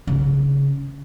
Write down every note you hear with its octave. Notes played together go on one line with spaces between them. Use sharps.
C#3